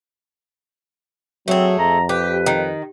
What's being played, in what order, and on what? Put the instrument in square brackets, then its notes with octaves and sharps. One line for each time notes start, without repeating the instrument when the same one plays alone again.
[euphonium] F#3 [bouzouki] A3 G#4 [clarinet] C4
[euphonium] F2 [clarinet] A#5
[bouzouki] G4 [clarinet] B4
[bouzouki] D#3